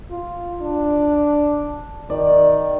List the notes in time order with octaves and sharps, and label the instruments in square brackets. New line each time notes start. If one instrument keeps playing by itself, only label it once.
[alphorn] F4
D4
[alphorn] D#3 [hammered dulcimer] D5